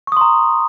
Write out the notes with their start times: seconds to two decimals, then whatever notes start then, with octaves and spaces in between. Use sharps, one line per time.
0.07 C#6
0.12 D#6
0.17 C6
0.21 A#5